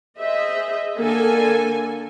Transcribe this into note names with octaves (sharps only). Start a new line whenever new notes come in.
G#4 C5 D#5 E5
D3 A#3 A4 G#5